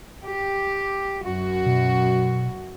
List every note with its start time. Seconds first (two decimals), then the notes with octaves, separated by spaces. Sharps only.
0.23 G4
1.23 F#2 F#4
1.66 B2